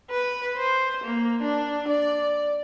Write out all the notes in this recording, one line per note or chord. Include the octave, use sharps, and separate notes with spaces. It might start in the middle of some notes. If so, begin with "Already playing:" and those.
B4
C5
A#3
D4
D5